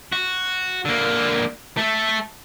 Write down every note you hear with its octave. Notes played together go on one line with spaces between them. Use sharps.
F#4
D3 A#3
A3 A4